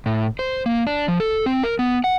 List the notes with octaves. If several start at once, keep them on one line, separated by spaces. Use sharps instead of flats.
A2
C5
A#3
D4
F3
A4
C4
A#4
B3
F#5